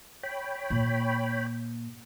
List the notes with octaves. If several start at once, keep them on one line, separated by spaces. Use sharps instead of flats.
C#5 G5 B5
A#2